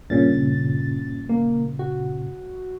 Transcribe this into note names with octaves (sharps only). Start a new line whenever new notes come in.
G2 A#2 C#3 A6
A#3
F#4